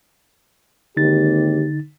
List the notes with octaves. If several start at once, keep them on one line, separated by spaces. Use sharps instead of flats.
G#1 D#2 D3 D#4 G4 A6